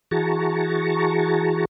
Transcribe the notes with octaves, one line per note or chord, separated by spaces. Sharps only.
E3 F#4 G#4 A5 A#5 C#6